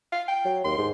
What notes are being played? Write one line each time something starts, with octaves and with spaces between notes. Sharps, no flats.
F5
G5
F#3
D#2 C6
G#2